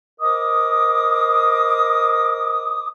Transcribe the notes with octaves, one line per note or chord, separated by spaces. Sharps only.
A#4 C5 D#5 D6 D#6